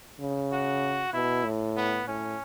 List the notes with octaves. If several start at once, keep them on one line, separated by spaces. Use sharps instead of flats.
C#3
F#4
B2 E4
A2
B3
A2 C#4